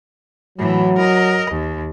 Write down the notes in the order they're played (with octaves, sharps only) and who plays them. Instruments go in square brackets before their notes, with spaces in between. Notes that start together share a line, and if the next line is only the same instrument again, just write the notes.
[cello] A2 E3 [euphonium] F#3
[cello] A#4 D#5
D#2